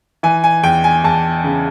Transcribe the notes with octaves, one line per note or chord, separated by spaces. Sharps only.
E3 G#5
G#5
E2 G5
G#5
E2 A5
C#3